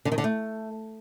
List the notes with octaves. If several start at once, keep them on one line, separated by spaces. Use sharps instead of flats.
D3
D#3
D3
A3